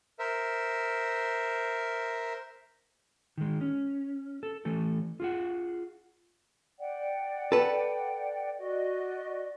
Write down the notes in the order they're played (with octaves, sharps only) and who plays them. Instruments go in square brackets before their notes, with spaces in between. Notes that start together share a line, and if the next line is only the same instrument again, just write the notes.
[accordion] A#4 C5 E5
[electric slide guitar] D#3 G#3
C#4
A4
E3 A3 A4
F4 G#4 F#5
[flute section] D5 F#5 G5
[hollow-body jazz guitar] A4 B4
[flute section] F#4 D5 D#5